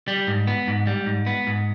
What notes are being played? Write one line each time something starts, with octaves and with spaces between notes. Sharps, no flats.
G3
G#2
B3
G#2
G3
G#2
B3
G#2